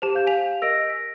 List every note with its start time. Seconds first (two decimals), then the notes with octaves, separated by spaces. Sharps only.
0.02 G4 C5 A5 F7
0.15 F5 G6
0.27 G#5 B6 F7
0.62 A#4 D#5 E6 A#6 D7
0.90 B6